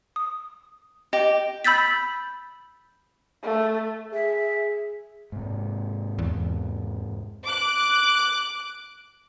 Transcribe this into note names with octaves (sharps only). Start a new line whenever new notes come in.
D#6
G4 D#5
B5 E6 G6 A6 B6
A3
G#4 E5
G#2 C3
E2
D6 F#6